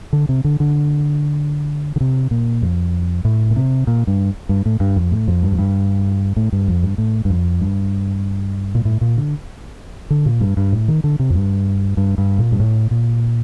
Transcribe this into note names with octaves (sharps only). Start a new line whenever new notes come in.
D3
C3
D3
D3
D3
C3
A#2
F2
A2
A#2
C3
A#2
G2
G2
A2
G2
F2
A2
F2
G2
F2
G2
A2
G2
F2
G2
A2
G2
F2
G2
A#2
A2
A#2
D3
D3
A#2
G2
G2
A2
D#3
D3
C3
F2
G2
G2
G2
A#2
G2
A2
A#2